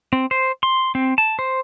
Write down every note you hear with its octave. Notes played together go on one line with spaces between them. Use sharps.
C4
C5
C6
C4
A5
C5